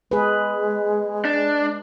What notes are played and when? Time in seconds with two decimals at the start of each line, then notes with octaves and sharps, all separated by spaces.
0.11 G#3 G#4 B4
1.25 D4